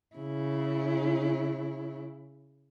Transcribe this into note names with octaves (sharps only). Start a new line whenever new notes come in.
C#3 E4